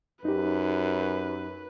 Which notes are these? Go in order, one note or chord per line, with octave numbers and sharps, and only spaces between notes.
F#2 D#4 G4 B4